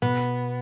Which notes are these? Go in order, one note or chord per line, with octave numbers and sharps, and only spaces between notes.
B2 B3